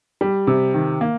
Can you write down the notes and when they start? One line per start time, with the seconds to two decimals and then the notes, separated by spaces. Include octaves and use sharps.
0.21 G3
0.47 C3
0.74 D#3
1.01 A#3